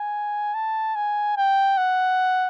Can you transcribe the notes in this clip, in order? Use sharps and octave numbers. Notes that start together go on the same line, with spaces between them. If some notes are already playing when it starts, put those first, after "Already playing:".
Already playing: G#5
A5
G#5
G5
F#5